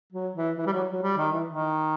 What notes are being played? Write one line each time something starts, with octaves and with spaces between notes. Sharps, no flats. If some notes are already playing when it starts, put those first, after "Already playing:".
F#3
E3
E3
G3
F#3
F#3
G3
D#3
E3
D#3